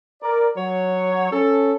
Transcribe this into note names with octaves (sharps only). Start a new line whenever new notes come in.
A#4 D5
F#3 C#5
C#4 A4